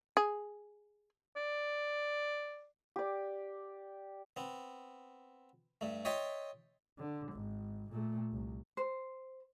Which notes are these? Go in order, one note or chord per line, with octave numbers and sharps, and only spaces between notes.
G#4
D5
G4 D5
B3 C4
G2 A3
C#5 D#5 E5 G5 A5 C6
D3
G#1
A#2 A3
C2
C5